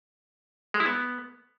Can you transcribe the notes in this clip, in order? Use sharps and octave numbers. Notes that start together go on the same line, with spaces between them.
G#3
E4
B3